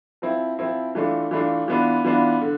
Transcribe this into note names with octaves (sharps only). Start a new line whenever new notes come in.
F3 C4 E4
F3 C4 E4
E3 A3 D4 F4
E3 A3 D4 F4
E3 B3 D4 F4
E3 B3 D4 F4
D3